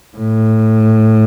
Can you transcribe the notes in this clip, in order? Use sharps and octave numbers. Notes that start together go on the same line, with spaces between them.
A2